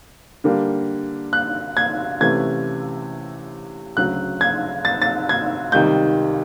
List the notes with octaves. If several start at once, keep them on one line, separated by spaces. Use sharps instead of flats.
D3 G3 A#3
F#6
G#6
C3 E3 A3 C#4 E4 G#6
D2 C#3 F#3 F#6
G#6
A6
A6
G#6
C#2 C3 D#3 G3 G6